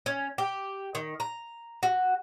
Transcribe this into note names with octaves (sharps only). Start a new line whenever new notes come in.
C#4
G4
D#3
A#5
F#4